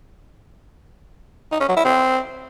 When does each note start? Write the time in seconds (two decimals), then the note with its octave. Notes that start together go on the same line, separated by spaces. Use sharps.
1.52 D#4
1.60 C#4
1.68 F#3
1.77 E4
1.85 C4